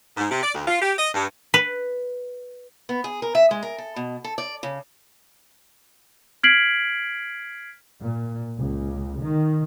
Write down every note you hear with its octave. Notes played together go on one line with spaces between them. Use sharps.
G#2
C3
D5
D2
F4
G4
D#5
G2
B4
B3
G#4
A#4
E5
G#3
A#4
A4
B2
A4
D5
C#3
F6 G#6 B6 C7 D7 F#7
A#2
C#2
D#3